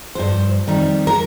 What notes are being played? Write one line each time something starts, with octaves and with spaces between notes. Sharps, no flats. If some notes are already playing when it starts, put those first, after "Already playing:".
G2 F3 C5
F2 D#3 G3
A#4